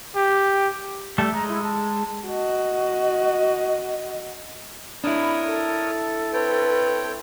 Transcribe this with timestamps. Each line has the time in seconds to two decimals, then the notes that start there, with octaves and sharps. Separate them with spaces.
0.16 G4
1.18 G3 A3 A4
1.33 G#3 A#5
1.48 E4
1.62 A5
2.27 F#4 D#5
5.04 D4 E4 A#4 C#5 B5 D#6
5.46 A4
6.33 C4 B4 C#5 G5